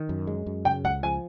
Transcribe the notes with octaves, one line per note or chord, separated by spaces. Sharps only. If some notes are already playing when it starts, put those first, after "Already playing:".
Already playing: D#3
F#2
G#3
F#2
C#3 G5
C#2 F#5
F3 G#5